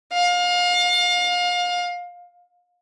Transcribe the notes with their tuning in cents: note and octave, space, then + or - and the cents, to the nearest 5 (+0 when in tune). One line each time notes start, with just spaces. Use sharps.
F5 +30